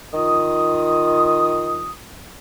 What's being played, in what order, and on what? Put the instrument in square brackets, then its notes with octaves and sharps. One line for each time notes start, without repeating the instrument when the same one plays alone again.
[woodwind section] D#3 F4 D#6